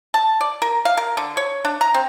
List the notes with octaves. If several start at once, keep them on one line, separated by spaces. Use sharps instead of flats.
A5
D5
A#4
F5
A#4
D3
C#5
D4
A#5
C4